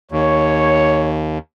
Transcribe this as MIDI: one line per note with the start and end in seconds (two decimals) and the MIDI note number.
0.12 1.38 39
0.12 1.16 73